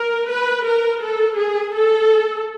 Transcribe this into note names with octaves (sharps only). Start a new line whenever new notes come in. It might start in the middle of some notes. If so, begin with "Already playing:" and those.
Already playing: A#4
B4
A#4
A4
G#4
A4